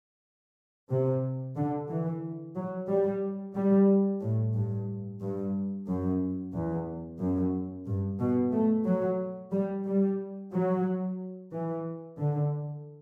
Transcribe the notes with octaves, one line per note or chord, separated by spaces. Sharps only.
C3
D3
E3
F#3
G3
G3
A2
G2
G2
F#2
E2
F#2
G2
B2
A3
F#3
G3
G3
F#3
E3
D3